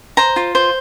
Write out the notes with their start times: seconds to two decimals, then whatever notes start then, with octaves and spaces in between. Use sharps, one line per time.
0.17 C5 A#5
0.36 F4
0.55 C5